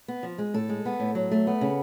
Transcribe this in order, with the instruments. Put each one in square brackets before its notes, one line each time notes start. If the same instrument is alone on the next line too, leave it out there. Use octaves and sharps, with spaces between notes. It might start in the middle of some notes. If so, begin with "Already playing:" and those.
[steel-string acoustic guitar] B3
F3
G#3
A2 A4
G#3
B3
A2
F#3
A3
B3
C#3